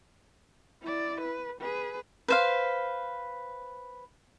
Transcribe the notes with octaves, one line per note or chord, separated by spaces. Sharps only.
E4 D5
B4
G#4 B4
B4 C5 F5